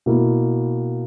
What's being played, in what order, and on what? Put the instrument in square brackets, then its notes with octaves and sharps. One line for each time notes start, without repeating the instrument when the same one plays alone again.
[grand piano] B2 A#3 E4